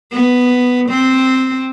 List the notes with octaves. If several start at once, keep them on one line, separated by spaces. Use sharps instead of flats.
B3
C4